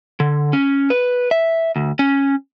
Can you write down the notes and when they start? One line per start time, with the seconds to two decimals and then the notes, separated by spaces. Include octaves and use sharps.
0.20 D3
0.53 C#4
0.90 B4
1.31 E5
1.76 D2
1.99 C#4